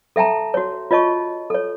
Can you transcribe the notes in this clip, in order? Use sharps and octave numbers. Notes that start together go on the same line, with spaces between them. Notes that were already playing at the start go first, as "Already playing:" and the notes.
A4 E5 G5 A5 A#5
F#4 C#5
F4 C#5 D#5 A5 C#6
A4 C#5